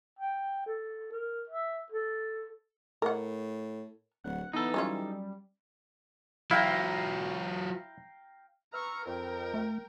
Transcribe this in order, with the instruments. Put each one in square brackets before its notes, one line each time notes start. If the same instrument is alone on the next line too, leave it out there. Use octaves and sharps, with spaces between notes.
[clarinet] G5
A4
A#4
E5
A4
[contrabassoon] A2 [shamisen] A#4 F#5
[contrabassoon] D1 [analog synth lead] F#5
[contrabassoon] E3 [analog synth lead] B3 [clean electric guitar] D#4 A4
[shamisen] F#3 C#4 F4 [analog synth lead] G3
[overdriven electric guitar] F#3 F4 [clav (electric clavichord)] E4 [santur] F5 G5 A#5
[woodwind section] B4 E6 F6 [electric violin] A#5 C#6
[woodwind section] F2 [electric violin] A#4 G5
[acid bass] A3